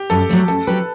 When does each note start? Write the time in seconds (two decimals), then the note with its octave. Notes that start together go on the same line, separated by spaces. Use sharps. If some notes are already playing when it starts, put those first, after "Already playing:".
Already playing: G4
0.10 F#2 A4
0.29 F#3 A3 C4
0.48 F#2 A4
0.67 F#3 C4 G4 B4